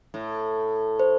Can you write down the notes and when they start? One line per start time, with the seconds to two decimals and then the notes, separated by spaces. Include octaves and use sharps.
0.14 A2
1.00 C5